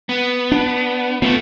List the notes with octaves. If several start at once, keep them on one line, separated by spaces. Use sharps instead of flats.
B3
D4
F3 A3 B3